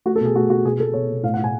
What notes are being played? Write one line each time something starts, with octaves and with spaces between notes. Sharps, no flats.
A3 F#4
A4
B2 G#4
A3 F#4
B2 F#4
B2 G#4
B2 A4
B2 C#5
B2
A2 F5
F#5
A2
G#5